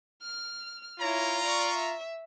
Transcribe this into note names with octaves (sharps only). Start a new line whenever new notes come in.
F6
E4 F4 C#5 A#5
D5 C#6
E5